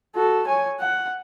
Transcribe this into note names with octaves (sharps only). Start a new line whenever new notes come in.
F#4 A4
C#5 G#5
F#5